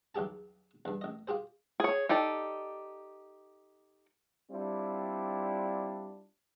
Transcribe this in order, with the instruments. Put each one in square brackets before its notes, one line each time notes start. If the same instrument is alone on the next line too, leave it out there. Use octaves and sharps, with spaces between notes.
[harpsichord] B1 E2 G4 G#4 A5
E2 G2
A1 D#5
F4 G4 G#4 C5
[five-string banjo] G#4 C#5
D#4 G4 A4 D5
[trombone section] G3 C4 D4 E4 F4